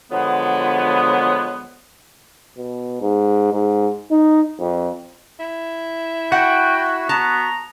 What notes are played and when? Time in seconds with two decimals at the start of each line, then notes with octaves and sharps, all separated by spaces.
0.12 D3 F3 F#3 G#3 B3
2.58 B2
3.01 G#2
3.53 G#2
4.11 D#4
4.60 F2
5.40 E4
6.32 F#4 F#5 G5
7.09 B3 A5 A#5